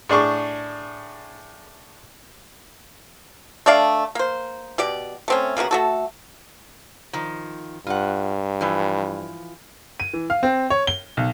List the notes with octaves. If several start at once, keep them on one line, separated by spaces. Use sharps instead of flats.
A2 D4 G#4 C#6 D6
A3 D4 D5 F5
A#3 C5
B2 G4 D5
A3 C4 C#4
C#3 A#3 B3 F#4
A3 F#4 A4
D#3 F3
G2 F4 F#5
E3 F3
D#7
E3
F5
C4
C#5
G7
B1